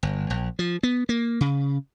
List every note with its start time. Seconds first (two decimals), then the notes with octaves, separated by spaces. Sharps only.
0.03 G1
0.30 A#1
0.59 F3
0.83 B3
1.09 A#3
1.41 C#3